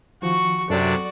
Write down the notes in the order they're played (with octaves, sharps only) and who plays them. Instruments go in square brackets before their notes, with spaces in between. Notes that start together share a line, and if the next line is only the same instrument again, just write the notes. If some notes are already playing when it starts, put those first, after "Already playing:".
[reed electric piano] D#3 F3 [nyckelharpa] F#4 C#6
[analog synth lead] F#2 [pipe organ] C3 D4 [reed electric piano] F#3 A4 [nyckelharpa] F#4 D5